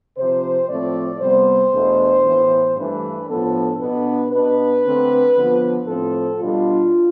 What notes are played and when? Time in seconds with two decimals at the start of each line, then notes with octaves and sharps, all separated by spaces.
0.17 C3 F3 C4 C5
0.68 A2 F3 A3 C4 D5
1.21 C3 G3 B3 C5
1.72 E2 B2 A3 D4
2.24 A2 E3 B3
2.76 G2 E3 A3 D4 B4
3.28 A2 F3 B3 D4 A4
3.80 B2 B3 D4 B4
4.31 B2 B3 D4 B4
4.85 D3 A3 C4
5.36 D3 F3 B3
5.87 A2 F3 C4 A4
6.39 B2 G3 D4 F4